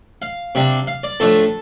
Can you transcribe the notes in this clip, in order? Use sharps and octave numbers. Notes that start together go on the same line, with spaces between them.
F5
C3 G3 D4
F5
D5
A2 F3 A3 D4 A4